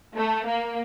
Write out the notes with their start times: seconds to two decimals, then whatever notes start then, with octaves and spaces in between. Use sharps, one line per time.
0.17 A3
0.46 A#3